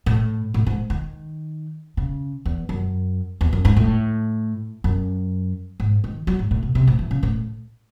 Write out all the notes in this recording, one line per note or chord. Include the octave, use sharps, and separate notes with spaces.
A2
A2
G#2
D#3
C#3
E2
F#2
E2
F#2
G#2
A2
F#2
G#2
D#3
F#3
G#2
A2
C3
C3
A2
E3
C#3
A2